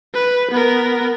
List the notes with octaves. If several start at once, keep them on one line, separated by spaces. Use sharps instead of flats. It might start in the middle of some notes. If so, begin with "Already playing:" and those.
B4
B3 A#4